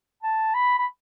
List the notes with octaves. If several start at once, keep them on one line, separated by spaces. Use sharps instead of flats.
A5
B5
B5